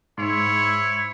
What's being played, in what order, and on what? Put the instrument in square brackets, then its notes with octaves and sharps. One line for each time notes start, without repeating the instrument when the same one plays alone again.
[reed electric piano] G#2 C6 [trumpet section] E4 C#5